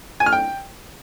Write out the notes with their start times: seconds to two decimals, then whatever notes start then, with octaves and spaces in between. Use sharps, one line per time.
0.20 G#5
0.26 F6
0.33 G5